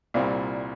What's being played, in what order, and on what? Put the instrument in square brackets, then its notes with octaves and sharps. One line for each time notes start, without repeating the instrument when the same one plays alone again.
[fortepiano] C2 A#2 G3 C4 F4